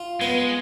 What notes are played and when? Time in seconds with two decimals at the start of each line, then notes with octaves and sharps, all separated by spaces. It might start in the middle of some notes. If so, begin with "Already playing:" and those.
Already playing: F4
0.21 G#3 B3